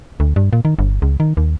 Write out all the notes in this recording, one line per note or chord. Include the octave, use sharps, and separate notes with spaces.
D2
G2
A#2
D#3
G1
C#2
D#3
D#2